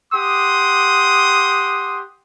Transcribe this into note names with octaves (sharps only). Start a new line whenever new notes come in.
G4 F#5 C6 D6 D#6